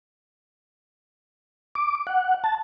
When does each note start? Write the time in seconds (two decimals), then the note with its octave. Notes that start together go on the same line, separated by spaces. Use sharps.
1.75 D6
2.07 F#5
2.44 A5